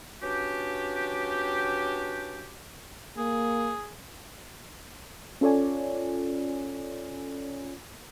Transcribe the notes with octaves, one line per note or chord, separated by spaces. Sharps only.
B3 C#4 D4 F#4 G4
A#3 G#4
C#4 F4 A4 C#5 D5 G#5